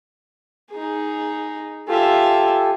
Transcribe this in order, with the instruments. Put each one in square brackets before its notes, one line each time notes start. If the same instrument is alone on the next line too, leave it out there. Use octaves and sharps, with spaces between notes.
[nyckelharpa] D#4 G#4
[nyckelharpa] F4 E5 [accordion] G4 A4 G#5